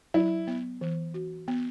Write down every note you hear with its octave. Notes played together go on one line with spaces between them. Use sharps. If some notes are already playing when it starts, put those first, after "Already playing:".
F#3 E4
B3
E3
F#4
B3